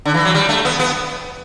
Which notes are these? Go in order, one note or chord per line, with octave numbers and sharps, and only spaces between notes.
D3
E3
F#3
G3
A3
B3
B3